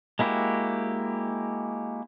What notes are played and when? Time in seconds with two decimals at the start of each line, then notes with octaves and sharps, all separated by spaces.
0.19 G#3 A#3 E4 F#4 G4